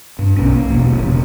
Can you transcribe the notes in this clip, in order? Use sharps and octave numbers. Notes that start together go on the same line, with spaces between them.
G2
B1 C#4
A#3
E1 A1 B2
A1 C#3
E1